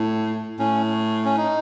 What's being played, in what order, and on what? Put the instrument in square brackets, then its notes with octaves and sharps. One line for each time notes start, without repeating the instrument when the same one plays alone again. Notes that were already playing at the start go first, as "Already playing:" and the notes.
Already playing: [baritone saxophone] A2
[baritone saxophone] A2 [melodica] C#4
[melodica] C#4
D#4